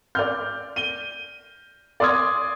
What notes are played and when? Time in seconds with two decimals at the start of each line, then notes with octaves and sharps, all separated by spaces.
0.15 D5 F6 G6
0.76 D#7 G7
2.00 D5 C6 D#6 G#6